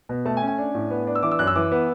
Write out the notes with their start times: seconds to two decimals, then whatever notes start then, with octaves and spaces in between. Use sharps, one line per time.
0.09 B2
0.25 A3 A5
0.37 G#5
0.42 C#4
0.47 G#5
0.58 D4
0.74 A2
0.91 B3
1.07 D4
1.15 E6
1.23 E3 D6
1.31 E6
1.39 F#2 F#6
1.47 E6
1.55 E3 D6
1.72 B3